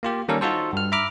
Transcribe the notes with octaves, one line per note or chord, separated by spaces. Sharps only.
A#3 F4 G4
D#3 G3 A#3 C#4 A4 A#4
D#4 F4 F#4 A4 C5
G2 F6
E5 A#5 B5 D6 F6